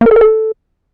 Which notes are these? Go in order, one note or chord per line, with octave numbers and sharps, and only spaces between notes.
A#3
A#4
A4
A#4
A4